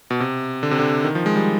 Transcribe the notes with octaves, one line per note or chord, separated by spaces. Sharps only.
B2
C3
D3
C3
D3
D#3
F3
G#3
G3